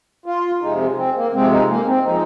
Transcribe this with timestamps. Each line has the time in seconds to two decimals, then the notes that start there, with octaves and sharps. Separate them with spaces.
0.26 F4
0.61 F2 C3 G#3 D#4
0.97 C4
1.15 A#3
1.33 F2 C3 G#3 C4
1.51 D#4
1.69 A#3
1.87 C4
2.05 F3 G#3 D#4